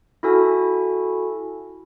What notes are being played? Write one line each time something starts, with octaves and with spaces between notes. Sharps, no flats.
E4 F#4 A4 G#5